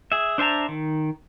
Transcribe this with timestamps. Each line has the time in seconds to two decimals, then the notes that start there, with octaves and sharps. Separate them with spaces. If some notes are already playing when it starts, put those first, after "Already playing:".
0.12 G#4 E5
0.38 D4 C5 E5 A5 A#5
0.69 D#3